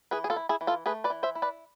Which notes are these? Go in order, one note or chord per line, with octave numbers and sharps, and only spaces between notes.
E3 G#4 B4
G#4
F4 A4
E4
E4 G#4
E3
F4 A4
A3 G#4 B4
B4 D5
E3
C5 E5
E4
B4 D5